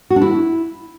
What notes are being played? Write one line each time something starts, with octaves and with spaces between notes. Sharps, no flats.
F#4
D4
E4